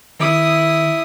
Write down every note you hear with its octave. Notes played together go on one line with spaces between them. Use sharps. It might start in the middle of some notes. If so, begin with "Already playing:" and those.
D#3 E4 D#6